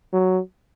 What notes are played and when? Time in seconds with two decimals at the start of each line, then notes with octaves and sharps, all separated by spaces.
0.13 F#3